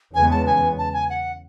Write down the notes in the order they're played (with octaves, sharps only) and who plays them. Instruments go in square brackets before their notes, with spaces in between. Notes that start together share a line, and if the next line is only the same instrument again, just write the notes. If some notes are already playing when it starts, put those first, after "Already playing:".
[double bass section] E2 C#3 G#3 B3 [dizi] G#5
[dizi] A5
G#5
A5
G#5
F#5